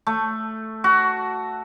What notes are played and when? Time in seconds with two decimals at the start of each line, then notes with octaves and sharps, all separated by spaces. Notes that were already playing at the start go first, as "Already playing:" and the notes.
0.07 A3
0.84 F#4